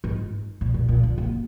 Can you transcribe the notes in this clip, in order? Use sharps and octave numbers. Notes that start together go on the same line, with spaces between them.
G#2
A#2
A#2
A#2
D3
A#3